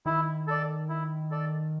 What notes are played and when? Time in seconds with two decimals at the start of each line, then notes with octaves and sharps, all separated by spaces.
0.06 D#3 E4
0.48 A4 D5
0.89 E4
1.31 A4 D5